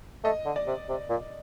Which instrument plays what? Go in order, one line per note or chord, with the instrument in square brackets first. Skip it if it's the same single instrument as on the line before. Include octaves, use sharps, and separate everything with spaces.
[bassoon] A3 [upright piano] D#5
[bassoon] D3
[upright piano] D5
[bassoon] C3
C3
A#2